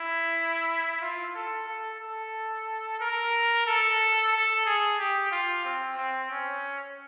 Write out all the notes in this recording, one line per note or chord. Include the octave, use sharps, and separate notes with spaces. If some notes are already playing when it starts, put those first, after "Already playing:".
Already playing: E4
F4
A4
A4
A4
A#4
A4
A4
G#4
G4
F4
C4
C4
C#4